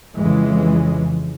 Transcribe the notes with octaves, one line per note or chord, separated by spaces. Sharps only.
F2 C#3 E3 G#3